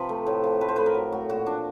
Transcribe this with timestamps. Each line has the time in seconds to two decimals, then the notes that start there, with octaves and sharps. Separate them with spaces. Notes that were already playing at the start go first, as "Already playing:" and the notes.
Already playing: C3 F3 B4
0.09 A3
0.27 A2
0.44 F3
0.61 A3 B4
0.69 C5
0.76 A2 B4
0.86 A#4
0.94 F#3
1.12 A3 F#4
1.29 A#2 F#4
1.46 F3 D4